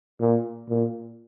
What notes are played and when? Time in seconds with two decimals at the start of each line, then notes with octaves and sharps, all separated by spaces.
0.20 A#2
0.69 A#2